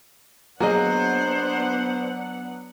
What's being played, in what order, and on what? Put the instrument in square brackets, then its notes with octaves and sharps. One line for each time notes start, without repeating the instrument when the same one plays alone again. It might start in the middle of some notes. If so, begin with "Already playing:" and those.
[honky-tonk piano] F#3 [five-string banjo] A#3 G#4 D#5 [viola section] B3 D4 F#5 [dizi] C5